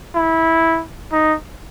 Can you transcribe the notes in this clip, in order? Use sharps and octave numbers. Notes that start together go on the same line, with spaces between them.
E4
D#4